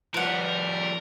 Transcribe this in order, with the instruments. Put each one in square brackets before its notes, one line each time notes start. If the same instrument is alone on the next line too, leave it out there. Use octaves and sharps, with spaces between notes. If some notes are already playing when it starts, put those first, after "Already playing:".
[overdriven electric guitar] F3 G3 [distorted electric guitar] A#4 [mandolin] B4 F#5